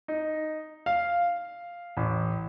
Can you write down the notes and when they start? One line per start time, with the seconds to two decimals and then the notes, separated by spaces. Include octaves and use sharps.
0.08 D#4
0.86 F5
1.97 A1